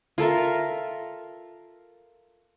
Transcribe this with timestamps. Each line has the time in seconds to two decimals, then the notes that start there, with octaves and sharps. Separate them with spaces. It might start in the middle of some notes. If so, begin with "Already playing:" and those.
0.18 F4 A4 A#4 E5